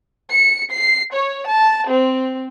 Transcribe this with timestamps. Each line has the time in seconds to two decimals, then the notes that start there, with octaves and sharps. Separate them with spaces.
0.30 C#7
0.72 C7
1.13 C#5
1.51 A5
1.90 C4